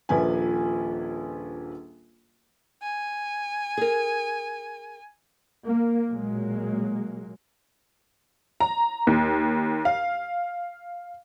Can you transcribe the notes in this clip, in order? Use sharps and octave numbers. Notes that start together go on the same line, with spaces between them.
D#1 A#1 F3 B4 G#5
G#5
G#4 A#4
A#3
B1 A#2 F#3 G#3 A#3
A#5
D#2
F5